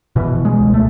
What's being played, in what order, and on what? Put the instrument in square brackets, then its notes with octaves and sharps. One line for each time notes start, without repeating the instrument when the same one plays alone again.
[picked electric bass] B2 E3
G#3
C#2
A3